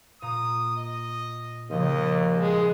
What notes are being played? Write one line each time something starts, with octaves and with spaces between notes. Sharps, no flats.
A#2 A#5 D#6
D#5
D#2 C#3 F3 D#5
G#3 B3